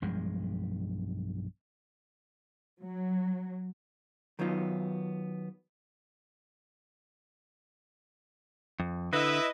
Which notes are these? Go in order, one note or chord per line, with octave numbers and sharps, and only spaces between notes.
B1 G2 F3 G#3
F#3
D#3 F#3 B3 D#4 F4
F2
D3 E4 B4 D#5 E5